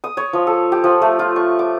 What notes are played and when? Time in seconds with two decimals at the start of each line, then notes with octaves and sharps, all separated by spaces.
0.04 D#6
0.17 C#5
0.33 F3
0.47 A4
0.72 G4
0.84 F3
1.02 A3
1.19 F4
1.36 C#6
1.59 D6